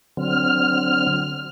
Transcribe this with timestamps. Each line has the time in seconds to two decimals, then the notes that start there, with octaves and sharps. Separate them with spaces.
0.17 D3 F#3 C4 F6